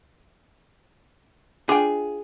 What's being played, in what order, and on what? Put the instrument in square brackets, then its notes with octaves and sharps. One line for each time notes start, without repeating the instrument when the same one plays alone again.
[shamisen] D4 F4 G5 [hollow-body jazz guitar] G#4